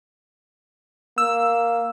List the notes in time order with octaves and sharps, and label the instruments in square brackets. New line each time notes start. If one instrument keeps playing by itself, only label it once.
[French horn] A#3 [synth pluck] E6